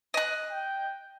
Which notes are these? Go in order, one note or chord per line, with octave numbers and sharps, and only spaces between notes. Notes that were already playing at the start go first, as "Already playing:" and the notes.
D#5 F#6
G5